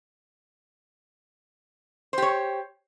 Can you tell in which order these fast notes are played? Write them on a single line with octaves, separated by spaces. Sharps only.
C5 G4 C#5